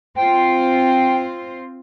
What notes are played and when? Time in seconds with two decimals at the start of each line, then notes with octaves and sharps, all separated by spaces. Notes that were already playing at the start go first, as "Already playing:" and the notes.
0.16 C4 F4 C5 G5